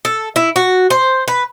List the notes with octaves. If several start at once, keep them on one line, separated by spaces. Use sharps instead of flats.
A4
E4
F#4
C5
B4